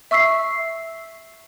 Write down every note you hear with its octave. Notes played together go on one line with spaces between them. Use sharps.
E5 C#6 E6 B6 C7